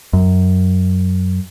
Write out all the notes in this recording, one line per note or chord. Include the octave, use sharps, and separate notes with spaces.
F#2